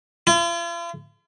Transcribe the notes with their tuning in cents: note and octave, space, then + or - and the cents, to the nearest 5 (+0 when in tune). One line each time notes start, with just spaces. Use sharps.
F4 -45